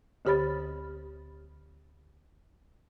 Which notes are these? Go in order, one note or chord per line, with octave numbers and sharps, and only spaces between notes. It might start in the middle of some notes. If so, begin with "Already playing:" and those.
D2 D3 G4 C#5 B5 A6